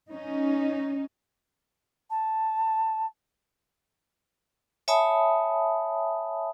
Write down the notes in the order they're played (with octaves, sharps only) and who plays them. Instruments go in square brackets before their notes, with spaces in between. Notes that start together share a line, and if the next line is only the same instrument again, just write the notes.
[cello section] C#4 D#4
[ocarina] A5
[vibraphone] C#5 E5 G#5 A5 B5 D#6